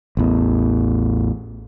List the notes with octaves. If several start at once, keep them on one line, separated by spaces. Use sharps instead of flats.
A1 E2